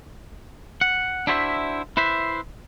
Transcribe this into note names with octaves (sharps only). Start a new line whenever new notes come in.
F#5
D4 E4 F#4 C5 C#5 E5
E4 B4 C5 E5